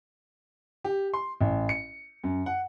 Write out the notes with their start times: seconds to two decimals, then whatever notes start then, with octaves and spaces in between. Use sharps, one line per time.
0.85 G4
1.13 C6
1.41 A1
1.69 C#7
2.24 F#2
2.46 F#5